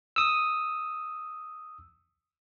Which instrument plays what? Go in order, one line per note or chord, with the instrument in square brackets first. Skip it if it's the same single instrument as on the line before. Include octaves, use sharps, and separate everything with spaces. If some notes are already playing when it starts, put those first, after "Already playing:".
[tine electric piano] D#6 E6